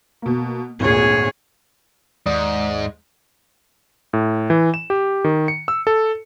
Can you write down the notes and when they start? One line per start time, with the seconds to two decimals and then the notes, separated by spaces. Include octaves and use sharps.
0.22 B2 A#3
0.80 G#1 D2 A#2 G#4 C#5
2.26 D#2 G#2 D5 D#6
4.13 A2
4.50 E3
4.74 E7
4.90 G4
5.24 D#3
5.48 C#7
5.68 E6
5.87 A4